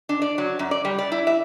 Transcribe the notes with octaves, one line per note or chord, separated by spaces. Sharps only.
D4
D5
F#3
F#2
D5
G3
D5
E4
E5